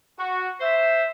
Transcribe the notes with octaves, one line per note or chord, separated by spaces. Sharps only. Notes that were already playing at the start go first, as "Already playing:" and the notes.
F#4
C5 E5